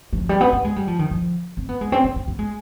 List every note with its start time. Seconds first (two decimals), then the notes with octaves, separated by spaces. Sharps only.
0.13 G3
0.17 F3
0.29 G3
0.41 B3
0.52 B3
0.65 G#3
0.76 G3
0.88 F3
0.99 D#3
1.11 F3
1.57 C4
1.69 B3
1.81 G#3
1.92 C4
2.04 C4
2.15 B3
2.28 B3
2.39 G#3